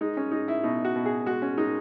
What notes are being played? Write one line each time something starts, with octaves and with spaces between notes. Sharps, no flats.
G#3 D#4
C#4
G#3 D#4
E4
B2 D#4
F#4
B2
G#4
G#3 F#4
C#4
G#3 D#4